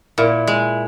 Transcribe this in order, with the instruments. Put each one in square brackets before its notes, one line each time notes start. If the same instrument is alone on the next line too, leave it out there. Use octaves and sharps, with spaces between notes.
[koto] A#2 [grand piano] E4
[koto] G#3